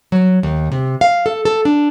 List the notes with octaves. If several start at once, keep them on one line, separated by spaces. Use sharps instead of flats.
F#3
D#2
C3
F5
A4
A4
D4